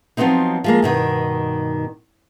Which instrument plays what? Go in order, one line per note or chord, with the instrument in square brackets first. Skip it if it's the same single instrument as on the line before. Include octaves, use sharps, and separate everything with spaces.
[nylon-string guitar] F3 F#3 G#3 B3 C4 D#4
F3 G#3 A#3
G2 B2 D#3